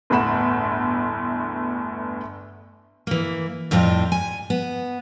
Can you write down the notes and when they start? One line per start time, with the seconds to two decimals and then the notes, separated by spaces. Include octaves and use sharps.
0.10 G1 E2 A2 F#5 B5 E7
3.07 E3 A#3
3.71 F2 A2 G3 C4 F4
4.12 G#5
4.50 B3